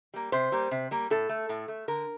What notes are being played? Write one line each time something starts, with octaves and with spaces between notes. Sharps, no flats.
G3 A#3
C3 C5
G3 A#3
C3
G3 A#3
A2 A4
A3
A2
A3
D3 A#4